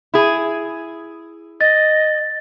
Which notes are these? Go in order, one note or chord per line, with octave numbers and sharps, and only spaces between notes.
E4 G#4
D#5 A6